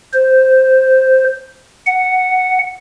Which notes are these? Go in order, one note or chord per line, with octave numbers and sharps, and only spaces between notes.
C5
F#5